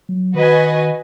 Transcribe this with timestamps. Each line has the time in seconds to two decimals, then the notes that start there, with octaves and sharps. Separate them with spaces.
0.09 F#3
0.35 D#3 F#4 B4 D#5 G#5